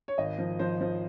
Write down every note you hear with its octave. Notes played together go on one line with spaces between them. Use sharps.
C#5
G#1 D#5
F3
F3 C5
F3